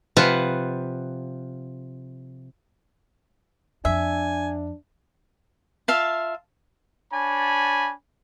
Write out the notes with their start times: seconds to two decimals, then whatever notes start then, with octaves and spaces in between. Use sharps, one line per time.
0.17 C3 F3 F4 B4 F5 F#5
3.85 F2 D4 E5 G#5
5.88 F4 E5 F5 A5
7.13 D4 C#5 G#5 A5 B5